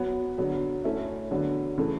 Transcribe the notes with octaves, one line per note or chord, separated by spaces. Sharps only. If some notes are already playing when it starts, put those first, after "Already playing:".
Already playing: F#3 B3 F#4 C#5
D3 F#3 B3
A3 C#4 E4
D3 F#3 B3
C#3 E3 A3